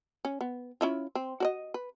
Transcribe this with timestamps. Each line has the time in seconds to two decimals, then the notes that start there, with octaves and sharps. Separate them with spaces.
0.25 C#4
0.41 B3
0.81 C#4 E4 F4
1.15 C4
1.40 F#4 D5 D#5
1.74 B4